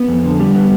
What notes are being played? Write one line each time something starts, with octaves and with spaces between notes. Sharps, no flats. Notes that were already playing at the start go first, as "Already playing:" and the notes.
Already playing: B3
F2
D3
G3
B3